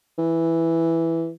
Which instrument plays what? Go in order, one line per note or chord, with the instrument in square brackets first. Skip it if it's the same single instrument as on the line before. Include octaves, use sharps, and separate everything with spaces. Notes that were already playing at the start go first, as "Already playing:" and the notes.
[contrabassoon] E3